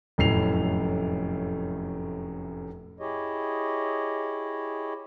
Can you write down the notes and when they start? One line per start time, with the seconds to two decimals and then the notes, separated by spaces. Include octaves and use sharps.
0.18 F1 F#2 A2 C7 F7
3.00 E4 G4 G#4 C#5 D#5